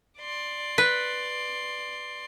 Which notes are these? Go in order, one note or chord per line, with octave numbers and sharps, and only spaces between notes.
D5 C6
B4